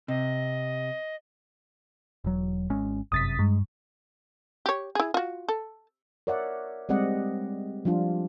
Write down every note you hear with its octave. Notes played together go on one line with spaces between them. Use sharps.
C3 D#5
E1 F#3
G#1 G#3 C#4
G1 F#2 C3 D#6 A6 B6
G2 G#3
G4 C#5
E4 G#4
F4 F#4
A4
A#4 C#5 D5 E5 F#5
G3 G#3 C4 D5 D#5 F#5
F3 G3 D4 F4